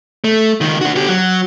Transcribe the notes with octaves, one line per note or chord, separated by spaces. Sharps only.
A3
C#2 D#3
D4 F#4
D3 G4
F#3